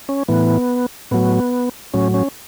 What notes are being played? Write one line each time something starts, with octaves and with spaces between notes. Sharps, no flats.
C#4
A2 E3 B3
A2 F#3 B3
A2 F#3 C#4
C#4